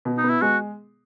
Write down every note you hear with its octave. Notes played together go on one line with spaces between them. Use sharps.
B2
D#4
B3
E4
G#3 F#4